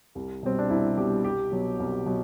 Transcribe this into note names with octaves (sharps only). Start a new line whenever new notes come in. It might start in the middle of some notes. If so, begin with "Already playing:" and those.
C2
B2 G3 C4
D4
C2 E4
B2 G3 G4
C2 G4
B2 F#3
C2
B2 F#3